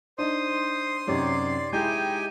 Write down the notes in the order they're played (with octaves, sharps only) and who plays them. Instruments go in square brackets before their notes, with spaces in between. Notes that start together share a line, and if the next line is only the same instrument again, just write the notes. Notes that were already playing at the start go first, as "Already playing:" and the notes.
[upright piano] D4 D#4 [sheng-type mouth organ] C5 D#6 [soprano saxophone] C6
[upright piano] F#2 C3 [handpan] D#4 G4 C#5 [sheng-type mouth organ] D5
[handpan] G#3 E4 G#4 [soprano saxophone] D#4 [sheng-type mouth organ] G4 G5 G#5 [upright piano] G6